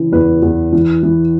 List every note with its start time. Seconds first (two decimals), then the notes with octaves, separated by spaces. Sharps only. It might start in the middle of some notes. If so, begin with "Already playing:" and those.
Already playing: C#3 E3
0.12 E2 B4
0.42 E2
0.73 E3
1.03 E3